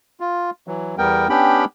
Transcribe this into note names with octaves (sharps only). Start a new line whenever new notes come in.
F4
E3 F#3
E2 G3 B3 A#4 G5
B3 C#4 D4 G4 G5 B5